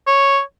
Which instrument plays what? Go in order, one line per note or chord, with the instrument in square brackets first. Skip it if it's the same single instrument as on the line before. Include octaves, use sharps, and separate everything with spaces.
[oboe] C#5